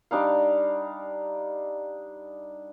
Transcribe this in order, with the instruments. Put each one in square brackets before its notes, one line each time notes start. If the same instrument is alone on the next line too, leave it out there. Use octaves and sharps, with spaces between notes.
[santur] G3 D4 D#4 F5